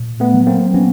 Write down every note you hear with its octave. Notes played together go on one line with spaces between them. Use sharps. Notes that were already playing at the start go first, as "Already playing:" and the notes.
Already playing: A#2
A3 B3
F#3
A#3 C4
F#3 B3 C#4